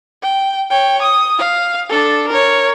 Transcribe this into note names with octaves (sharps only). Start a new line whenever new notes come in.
G5
C#5 G5
D#6
F5
D4 A4
A#4 C#5